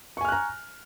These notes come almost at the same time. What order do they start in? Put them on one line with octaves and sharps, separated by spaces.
C#6 G#5 F6 F#6 A#5